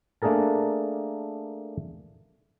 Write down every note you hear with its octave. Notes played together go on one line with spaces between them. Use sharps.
A3 A#3 D4 G#4 A#4 A5